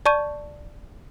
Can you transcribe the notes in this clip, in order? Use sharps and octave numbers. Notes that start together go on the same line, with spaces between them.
D5 A5 C#6 G6 D#7